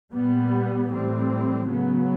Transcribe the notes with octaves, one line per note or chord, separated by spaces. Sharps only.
A#2 G3 B3
A2 E3 G3 C4
C#3 F#3 B3